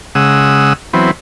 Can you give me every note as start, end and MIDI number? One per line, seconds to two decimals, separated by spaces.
0.15 0.73 49
0.15 0.73 56
0.15 0.73 78
0.15 0.73 87
0.15 0.73 88
0.93 1.11 52
0.93 1.11 54
0.93 1.11 59
0.93 1.11 60